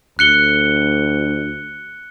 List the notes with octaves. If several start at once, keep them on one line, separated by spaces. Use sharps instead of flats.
D2 F#6 C#7 G7